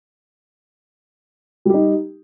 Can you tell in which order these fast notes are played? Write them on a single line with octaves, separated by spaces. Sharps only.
G3 G4 D#4